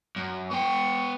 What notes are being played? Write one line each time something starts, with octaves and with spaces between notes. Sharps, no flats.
F#2
B3 G5 C#6